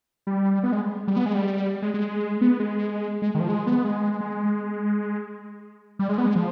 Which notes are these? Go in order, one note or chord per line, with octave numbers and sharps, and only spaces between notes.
G3
B3
G#3
G3
B3
G#3
G3
G#3
G#3
B3
G#3
G#3
D#3
F3
G#3
B3
G#3
G#3
G3
G#3
B3
G#3
F3